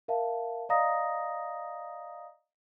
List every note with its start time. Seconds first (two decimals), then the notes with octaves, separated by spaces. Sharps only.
0.08 A#4 E5 F5 A5
0.69 D5 D#5 F5 A#5 D#6 A#6